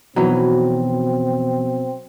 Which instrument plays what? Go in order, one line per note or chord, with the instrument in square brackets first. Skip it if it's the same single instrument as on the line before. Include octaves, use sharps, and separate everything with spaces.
[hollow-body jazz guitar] F2 E3 [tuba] B2 [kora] F#3 D#4 B4 [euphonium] C4